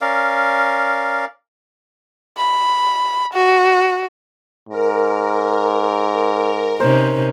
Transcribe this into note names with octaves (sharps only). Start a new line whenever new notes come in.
C#4 A#4 D5 F5
B5
F#4
G#2 A#4
C3 C#4 D#4 A#4 C5